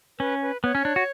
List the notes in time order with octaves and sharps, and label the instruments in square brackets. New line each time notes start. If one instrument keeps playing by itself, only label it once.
[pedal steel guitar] C#4 [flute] B4
[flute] B4
[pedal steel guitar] B3 [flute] C#5
[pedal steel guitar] C#4
D4
F#4